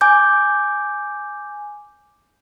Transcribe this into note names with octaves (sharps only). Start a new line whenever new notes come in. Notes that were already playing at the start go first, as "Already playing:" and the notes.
G#5 D6 G6